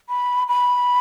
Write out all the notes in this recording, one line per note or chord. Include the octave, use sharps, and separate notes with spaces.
B5
B5